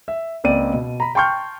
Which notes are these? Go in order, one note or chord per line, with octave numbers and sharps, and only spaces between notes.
E5
C#2 A#3 C4 D5 D#7
B2
A#5 B5
G5 A5 C6 C#6 F6 G6